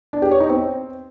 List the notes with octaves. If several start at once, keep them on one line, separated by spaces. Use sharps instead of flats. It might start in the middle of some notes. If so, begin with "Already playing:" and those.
D4
G4
C#5
D#4
C4